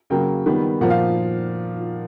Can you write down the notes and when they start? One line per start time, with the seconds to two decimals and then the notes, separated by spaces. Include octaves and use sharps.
0.10 C#3 F#3 A#3 G5
0.46 D#3 G3 B3
0.81 A#2 F3 A#3 F#5
0.90 F5